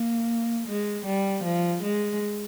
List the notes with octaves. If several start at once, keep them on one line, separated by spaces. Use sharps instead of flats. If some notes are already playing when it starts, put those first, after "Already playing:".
Already playing: A#3
G#3
G3
F3
G#3